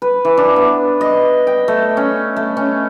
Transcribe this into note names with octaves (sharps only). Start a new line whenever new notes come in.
B4
E3
D4
B3
D#5
G5
A3
C#4
A3
C#4